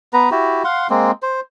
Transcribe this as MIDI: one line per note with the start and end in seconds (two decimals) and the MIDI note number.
0.13 0.30 59
0.13 0.30 71
0.13 0.30 82
0.31 0.63 64
0.31 0.63 66
0.31 0.63 67
0.64 0.87 77
0.64 0.87 78
0.64 0.87 84
0.90 1.11 56
0.90 1.11 58
0.90 1.11 60
1.22 1.40 72